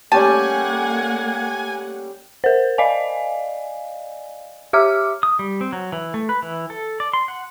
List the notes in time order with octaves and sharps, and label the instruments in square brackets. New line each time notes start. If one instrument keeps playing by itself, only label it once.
[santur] G3 C#4 G4 [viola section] A3 A#3 F#5 [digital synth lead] G#5 [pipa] A5
[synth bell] A#4 C5
D5 D#5 F5 G#5
G4 E5 D6 F6
[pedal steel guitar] D#6
G3
C4
F#3
E3
A3
B4
E3
A4
D5
C6
F#5